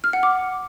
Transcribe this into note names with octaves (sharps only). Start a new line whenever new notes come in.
F6
F#5
D6